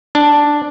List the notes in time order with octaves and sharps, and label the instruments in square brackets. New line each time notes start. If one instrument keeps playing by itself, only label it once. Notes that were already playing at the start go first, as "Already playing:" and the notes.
[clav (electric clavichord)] D4